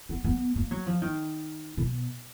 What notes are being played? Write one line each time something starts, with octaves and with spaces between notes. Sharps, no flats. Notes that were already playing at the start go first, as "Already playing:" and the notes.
B3
B3
A#3
F#3
F3
D#3
B2